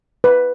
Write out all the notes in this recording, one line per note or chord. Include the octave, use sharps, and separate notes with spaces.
B4